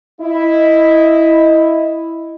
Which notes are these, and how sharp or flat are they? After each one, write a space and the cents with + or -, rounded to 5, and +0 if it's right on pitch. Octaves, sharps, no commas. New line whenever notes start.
E4 +0 D#5 +5